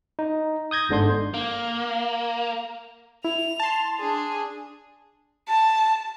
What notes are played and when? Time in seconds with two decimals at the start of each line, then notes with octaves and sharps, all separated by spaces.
0.19 D#4
0.71 D#6 G6 G#6 A#6
0.89 G1 G#2 D3 D4 C6 G6
1.34 A#3
3.25 E4 F7
3.60 A5 C6
3.99 D4 G#4
5.49 A5